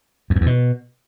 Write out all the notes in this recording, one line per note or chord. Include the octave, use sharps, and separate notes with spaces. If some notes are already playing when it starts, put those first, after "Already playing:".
F2
F#2
E2
B2